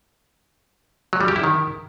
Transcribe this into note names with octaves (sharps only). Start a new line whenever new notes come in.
F#3
G3
G4
E4
D#3